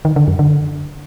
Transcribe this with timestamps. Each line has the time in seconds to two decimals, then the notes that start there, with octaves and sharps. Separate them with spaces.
0.05 D#3
0.16 D3
0.28 F#2
0.39 D3